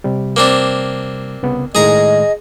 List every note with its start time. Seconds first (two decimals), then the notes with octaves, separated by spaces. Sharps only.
0.04 C3 G3
0.36 A#3 C4 D4
1.43 C2 C#3 B3
1.75 A2 D#3 G#3 G#4 D#5 A#5